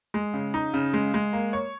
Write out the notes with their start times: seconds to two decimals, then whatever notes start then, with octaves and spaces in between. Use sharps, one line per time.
0.14 G#3
0.34 C#3
0.54 D#4
0.74 C#3
0.94 G#3
1.14 G#3
1.33 A#3
1.53 C#5